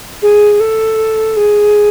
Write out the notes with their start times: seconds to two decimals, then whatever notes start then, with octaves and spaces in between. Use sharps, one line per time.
0.22 G#4
0.60 A4
1.37 G#4